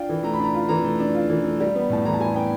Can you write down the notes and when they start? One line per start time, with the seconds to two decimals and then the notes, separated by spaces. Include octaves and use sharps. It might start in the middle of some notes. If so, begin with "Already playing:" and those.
Already playing: D4 F4 G5
0.09 E3
0.23 A3 A#5
0.33 B5
0.39 D4 A#5
0.54 F4
0.69 E3 A#5
0.84 A3
1.00 D4
1.14 F4
1.30 E3
1.44 A3
1.60 G3
1.75 B3
1.90 A2 A5
2.05 E3 A#5
2.14 A5
2.20 G3 G#5
2.35 B3 G5